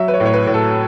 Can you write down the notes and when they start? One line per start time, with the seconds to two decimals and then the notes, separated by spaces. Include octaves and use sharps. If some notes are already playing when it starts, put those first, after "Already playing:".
Already playing: F#3 E5
0.08 B4
0.14 C#5
0.20 A2
0.26 C#5
0.33 B4
0.47 A2
0.54 A4